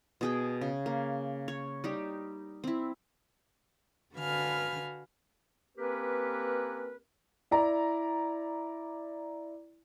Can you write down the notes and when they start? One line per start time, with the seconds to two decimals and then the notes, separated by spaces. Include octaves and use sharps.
0.21 B2 G#4 G5
0.61 C#3
0.86 A#3
1.48 C#5
1.84 G3 D#4 G4
2.64 C4 E4
4.15 D3 F#4 B4 F5 G#5 F6
5.78 A#3 C4 C#4 G4 A#4 B4
7.51 E4 D5 A#5